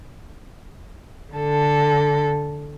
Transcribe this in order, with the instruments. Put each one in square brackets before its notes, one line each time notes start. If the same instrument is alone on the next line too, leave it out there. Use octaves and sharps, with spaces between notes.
[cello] D3 A4